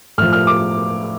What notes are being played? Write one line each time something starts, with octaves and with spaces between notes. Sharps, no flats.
A2 F3 F6
F6
D6